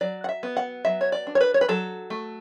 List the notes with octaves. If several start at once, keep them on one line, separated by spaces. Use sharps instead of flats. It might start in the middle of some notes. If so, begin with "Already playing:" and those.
F#3 D5
F#5
E5
B3
F#5
F#3 E5
C#5
D5
D4
C#5
B4
C#5
B4
F#3 A4
A3